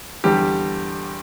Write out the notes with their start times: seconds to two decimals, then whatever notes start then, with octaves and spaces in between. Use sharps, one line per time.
0.24 E2 D3 G3 G4